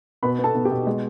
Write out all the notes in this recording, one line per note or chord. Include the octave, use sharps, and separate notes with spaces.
B2 B4 B5
B3
A4 A5
B2
G4 G5
B2
G#3